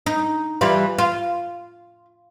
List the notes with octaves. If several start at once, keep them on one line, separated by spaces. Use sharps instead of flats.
D#4
E3 G3 F4
F4